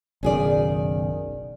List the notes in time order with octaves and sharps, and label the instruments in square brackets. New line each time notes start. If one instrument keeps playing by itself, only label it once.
[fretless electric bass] F#1 B1 D#3 [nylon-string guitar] C#4 G#4 D5